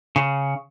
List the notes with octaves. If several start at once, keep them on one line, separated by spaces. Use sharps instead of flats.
C#3